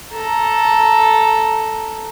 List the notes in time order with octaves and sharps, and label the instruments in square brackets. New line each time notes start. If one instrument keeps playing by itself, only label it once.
[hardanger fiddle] A4 A#5